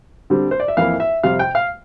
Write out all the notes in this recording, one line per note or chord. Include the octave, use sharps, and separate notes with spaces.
D3 G3 C4
C5
D5
E5
F2 E3 A#3 E4 F5
E5
F2 C3 G3 F5
G5
F5